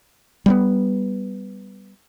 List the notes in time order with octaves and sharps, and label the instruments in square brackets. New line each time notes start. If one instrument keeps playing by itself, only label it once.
[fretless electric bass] G3 A#3 B3